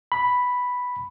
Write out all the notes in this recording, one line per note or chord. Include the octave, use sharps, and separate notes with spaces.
B5